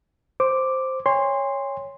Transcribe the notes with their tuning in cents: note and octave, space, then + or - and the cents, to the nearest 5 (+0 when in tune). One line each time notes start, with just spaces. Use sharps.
C5 +0 D6 +0
C#5 +0 G#5 -45 C6 +0